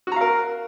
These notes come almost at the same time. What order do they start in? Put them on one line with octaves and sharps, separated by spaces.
F#4 A#5 F5 A#4